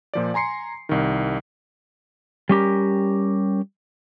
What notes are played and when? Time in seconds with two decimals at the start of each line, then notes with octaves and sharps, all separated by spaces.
0.14 A#2 F3 D5
0.34 G#5 A#5 C6 C7 C#7
0.89 C2 D#3
2.49 G3 C#4 G4 A#4